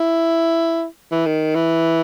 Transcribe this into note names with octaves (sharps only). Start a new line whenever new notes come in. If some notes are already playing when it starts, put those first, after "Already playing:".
Already playing: E4
E3
D#3
E3